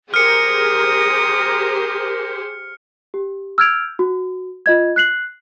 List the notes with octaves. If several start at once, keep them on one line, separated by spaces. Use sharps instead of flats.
G4 G#4 A#4 C5 D#6 F6 C#7
G4
E6 F6 G6 G#6 D7 F7
F#4
F4 D#5 G#6
F#6 C7 F#7